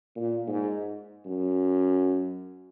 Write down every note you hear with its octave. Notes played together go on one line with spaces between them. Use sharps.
A#2
G#2
F#2